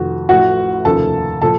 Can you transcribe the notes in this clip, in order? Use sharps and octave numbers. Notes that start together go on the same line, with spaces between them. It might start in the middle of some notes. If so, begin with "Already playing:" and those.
Already playing: F1 F2 D#3 F#4
A1 A2 F3 F#4 F#5
F1 D#2 C#3 F3 A4 A5
A#2 F3 A4 A5